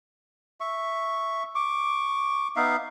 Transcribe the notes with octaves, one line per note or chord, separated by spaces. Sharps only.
E5 C#6
C#6 D6
B3 D#4 E5 F5